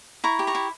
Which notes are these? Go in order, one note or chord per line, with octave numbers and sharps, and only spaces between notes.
E4 A#5 C#6
G4
A#5 C#6
E4